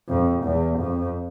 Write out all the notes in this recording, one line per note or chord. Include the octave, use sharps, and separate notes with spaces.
F2
E2
F2